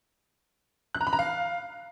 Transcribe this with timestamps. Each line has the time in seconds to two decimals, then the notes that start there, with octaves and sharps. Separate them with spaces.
0.95 F#6
1.01 A#5
1.07 B5
1.13 A#5
1.19 F5